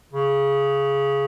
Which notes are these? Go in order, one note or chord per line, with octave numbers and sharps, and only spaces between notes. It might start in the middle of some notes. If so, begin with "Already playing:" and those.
C#3